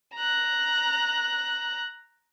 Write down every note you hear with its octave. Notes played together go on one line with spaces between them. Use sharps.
A#5 F#6